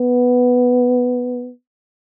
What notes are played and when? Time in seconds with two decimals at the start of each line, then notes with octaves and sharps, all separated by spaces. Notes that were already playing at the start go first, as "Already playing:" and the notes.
Already playing: B3